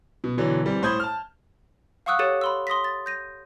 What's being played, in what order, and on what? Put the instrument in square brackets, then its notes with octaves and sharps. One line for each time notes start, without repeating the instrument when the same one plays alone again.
[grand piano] B2
B2 D3 E3 F#3
E3 G3 C4
A2 C5 B5 D#6 G6 G#6
A5 F6
[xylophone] F5 F#5 C#6 D#6 E6 F#6
G4 A4 C#5 A6 C#7 D#7
B5 C6 E6
C6 D#6 A#6 B6
A6
G6 A#6 D#7